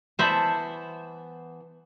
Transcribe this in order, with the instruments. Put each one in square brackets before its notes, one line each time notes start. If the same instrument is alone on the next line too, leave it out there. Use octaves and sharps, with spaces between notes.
[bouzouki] E3 B3 A5 [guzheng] C5 E5 B5